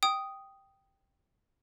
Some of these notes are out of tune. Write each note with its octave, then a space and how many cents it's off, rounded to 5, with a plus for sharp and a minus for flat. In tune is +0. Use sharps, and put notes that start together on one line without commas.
G5 +0 D#6 +0